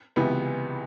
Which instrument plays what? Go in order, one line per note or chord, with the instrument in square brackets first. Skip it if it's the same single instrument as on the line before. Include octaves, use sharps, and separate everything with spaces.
[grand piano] C#2 C3 E3 B3